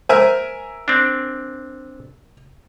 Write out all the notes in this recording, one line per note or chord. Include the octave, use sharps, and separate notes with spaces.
A#4 C5 E5 G#5
C4 D4